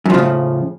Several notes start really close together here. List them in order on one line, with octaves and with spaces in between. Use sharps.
F#2 F3 C#3 A2